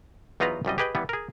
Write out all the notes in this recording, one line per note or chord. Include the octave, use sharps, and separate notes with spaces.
E2 F#3 D#4 F4 B4 A#5
C2 F#2 G3 D#5
G4 G#4 B4 D#5 G5
E3 G3 B3
G#4 A#4